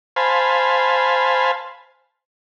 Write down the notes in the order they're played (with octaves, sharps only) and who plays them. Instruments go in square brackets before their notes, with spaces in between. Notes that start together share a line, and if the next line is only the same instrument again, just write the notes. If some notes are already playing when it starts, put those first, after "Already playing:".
[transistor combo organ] C5 F5 G#5 A5 B5